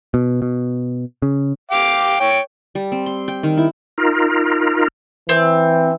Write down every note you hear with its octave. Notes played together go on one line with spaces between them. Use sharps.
B2
B2
C#3
F5 G5 D6
C#5 G5
G3
C4
C6
G5
D#3
E4
D#4 F4 A#4
E3 C4